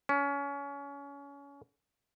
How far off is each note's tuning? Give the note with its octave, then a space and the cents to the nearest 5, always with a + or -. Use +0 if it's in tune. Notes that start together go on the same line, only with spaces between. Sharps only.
C#4 +25